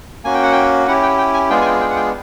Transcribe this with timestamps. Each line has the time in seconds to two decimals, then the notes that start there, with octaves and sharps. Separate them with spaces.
0.24 A#3 C#4 F#4 G#5
0.34 G5
0.43 F#5
0.52 G5
0.87 C#4 E4 G4 F#5
1.03 G5
1.18 G5
1.34 G#5
1.50 G#3 B3 D4 F4 G#4 G5
1.61 G#5
1.65 G5
1.81 G5
1.90 F#5
1.96 G5